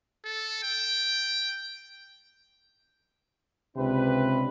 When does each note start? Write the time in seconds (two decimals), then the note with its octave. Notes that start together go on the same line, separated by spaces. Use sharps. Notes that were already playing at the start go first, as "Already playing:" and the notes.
0.25 A4
0.63 G5
3.77 C#2 C3 D4 B4